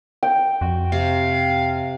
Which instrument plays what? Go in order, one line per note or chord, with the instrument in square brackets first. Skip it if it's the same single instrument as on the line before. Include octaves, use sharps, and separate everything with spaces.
[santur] G5
[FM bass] F2 [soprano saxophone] F#4
[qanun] C3 [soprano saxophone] F5